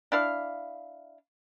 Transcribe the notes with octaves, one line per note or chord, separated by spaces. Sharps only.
D4 E4 F5